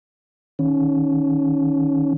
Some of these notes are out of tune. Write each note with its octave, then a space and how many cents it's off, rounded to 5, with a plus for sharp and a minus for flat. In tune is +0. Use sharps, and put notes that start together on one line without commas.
D#3 +0 C#4 +0